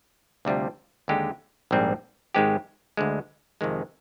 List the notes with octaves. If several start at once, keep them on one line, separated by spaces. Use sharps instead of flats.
D2 C3 G3 D4 F4
D#2 D3 G#3 D#4 G4
A#1 G#2 G3 C4
G#2 D#3 G#3 C4 G4
D2 D3 G#3
F2 C3 D#3 G#3